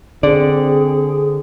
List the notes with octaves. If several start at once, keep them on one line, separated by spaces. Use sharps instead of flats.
D3 C4 G#4 D5